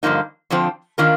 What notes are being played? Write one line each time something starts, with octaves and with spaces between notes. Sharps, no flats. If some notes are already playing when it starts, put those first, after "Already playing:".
G2 D3 F3 A#3 D#4
F2 D3 F3 C4
D#3 A#3 D4 F4 A#4